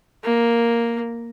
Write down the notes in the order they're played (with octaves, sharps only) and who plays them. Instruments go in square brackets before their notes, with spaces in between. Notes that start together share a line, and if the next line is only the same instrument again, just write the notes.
[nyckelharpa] A#3